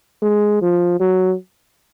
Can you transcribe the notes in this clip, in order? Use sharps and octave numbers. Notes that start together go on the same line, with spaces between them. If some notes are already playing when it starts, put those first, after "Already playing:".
G#3
F3
F#3